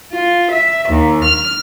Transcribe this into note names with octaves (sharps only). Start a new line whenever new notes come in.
F4
E5
D#2
F6